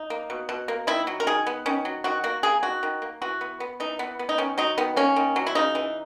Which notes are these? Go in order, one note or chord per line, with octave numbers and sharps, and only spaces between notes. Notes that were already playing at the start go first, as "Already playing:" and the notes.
Already playing: D#4
A#3
B2
B2
A#3
D#3 E4
F#3
A#4
D#3 G#4
B3
D#3 C#4
F#3
D#3 F#4
A#3 F#4
A#3 G#4
D#3 F#4
D#3
A#3
E3 F#4
B3
B3
E3 D#4
E3 B3
B3
D#4
D#3 C#4
F#3 D#4
D#3 B3
A#3 C#4
D#3
F#3
E4
C#3 D#4
E3